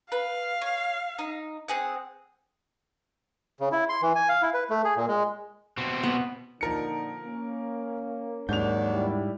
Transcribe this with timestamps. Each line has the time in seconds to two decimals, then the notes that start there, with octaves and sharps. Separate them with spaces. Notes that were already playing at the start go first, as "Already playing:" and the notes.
0.12 B4 F5
0.62 C#5
1.19 D#4
1.68 C4 G#4 F#5
3.60 C#3
3.72 E4
3.89 C6
4.02 E3
4.15 G#5
4.29 F5
4.42 E4
4.54 B4
4.70 A3
4.85 G#4
4.96 A#2
5.08 G#3
5.77 B2 C4
6.03 B3
6.61 A#2 D3 F3 D#4 A#4 C#7
7.23 A#3 C#4
8.49 D#2 G#2 F#3 D4 G6 F7
8.92 G3 E4